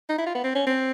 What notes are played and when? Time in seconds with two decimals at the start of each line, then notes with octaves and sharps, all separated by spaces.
0.09 D#4
0.18 E4
0.26 F4
0.35 B3
0.44 C4
0.55 C#4
0.67 C4